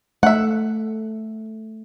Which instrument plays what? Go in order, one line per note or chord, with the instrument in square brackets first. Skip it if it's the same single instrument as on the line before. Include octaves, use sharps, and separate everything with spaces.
[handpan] A3 [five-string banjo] E5 F#5